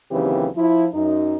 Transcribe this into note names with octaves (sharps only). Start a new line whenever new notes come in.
D#2 C#3 E3 F#3 C4 G4
F3 E4
F#2 D#4